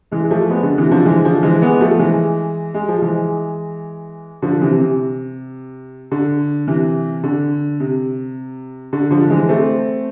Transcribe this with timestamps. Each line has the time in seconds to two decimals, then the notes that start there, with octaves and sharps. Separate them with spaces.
0.11 E3 G#3
0.23 G#3
0.31 F3 A3
0.50 G#3 B3
0.63 D3
0.77 C3 E3
0.91 D3 F3
1.06 E3 G#3
1.25 D3 F3
1.43 E3 G#3
1.62 G#3 B3
1.81 F3 A3
1.99 E3 G#3
2.74 G#3
2.88 F3
3.02 E3 G#3
4.42 D3 F3
4.62 C3 E3
4.80 C3
6.12 D3
6.68 C3 E3
7.24 D3
7.80 C3
8.93 D3
9.11 D3 F3
9.30 E3 G#3
9.49 A3 C4